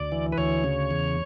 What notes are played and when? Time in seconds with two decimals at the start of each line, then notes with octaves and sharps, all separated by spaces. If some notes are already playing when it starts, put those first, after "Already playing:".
Already playing: D2 D5
0.12 E3
0.32 B4
0.38 D2 C#5
0.64 C#3
0.91 E2